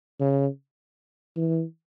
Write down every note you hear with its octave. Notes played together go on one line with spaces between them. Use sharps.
C#3
E3